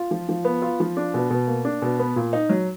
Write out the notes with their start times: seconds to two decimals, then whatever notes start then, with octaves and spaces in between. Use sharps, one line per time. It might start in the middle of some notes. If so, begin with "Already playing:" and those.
Already playing: F4
0.11 F3
0.29 F3
0.45 B3
0.62 F4
0.80 F3
0.97 D4
1.14 B2
1.30 B2
1.47 A#3
1.65 D4
1.82 B2
1.99 B3
2.16 A#2
2.33 D#4
2.49 F#3